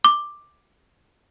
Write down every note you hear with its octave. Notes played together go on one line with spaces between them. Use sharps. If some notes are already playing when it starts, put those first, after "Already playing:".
D6